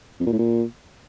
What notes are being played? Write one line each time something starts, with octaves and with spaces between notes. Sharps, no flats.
F2
A#2
A2
A#2